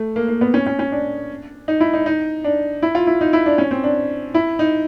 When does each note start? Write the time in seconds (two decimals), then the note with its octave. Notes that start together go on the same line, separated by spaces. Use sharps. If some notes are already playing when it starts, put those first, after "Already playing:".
Already playing: A3
0.16 A#3
0.28 A#3
0.41 B3
0.54 C#4
0.66 C#4
0.79 C#4
0.92 D4
1.68 D#4
1.80 E4
1.93 D#4
2.06 D#4
2.44 D4
2.83 E4
2.95 F4
3.07 E4
3.21 D#4
3.33 E4
3.46 D4
3.58 C#4
3.71 C4
3.84 D4
4.34 E4
4.59 D#4